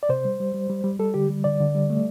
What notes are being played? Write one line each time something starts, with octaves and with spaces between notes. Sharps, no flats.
D5
C3 C5
G3
G3
G3
G3
G3
G3 A4
D3 G4
G3
D3 D5
D3
G3
A3